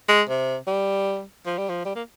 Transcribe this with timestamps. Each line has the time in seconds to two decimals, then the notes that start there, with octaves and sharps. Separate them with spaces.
0.09 G#3
0.29 C3
0.67 G3
1.46 F3
1.58 G3
1.69 F3
1.85 G3
1.96 A#3